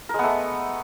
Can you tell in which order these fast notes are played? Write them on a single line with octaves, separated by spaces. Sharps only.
A#4 G#3 B3 A3